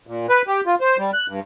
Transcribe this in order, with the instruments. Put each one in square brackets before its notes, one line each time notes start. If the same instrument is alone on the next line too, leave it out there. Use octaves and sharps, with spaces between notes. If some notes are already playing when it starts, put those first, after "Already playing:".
[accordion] A#2
B4
G4
F4
C5
G3
F#6
G2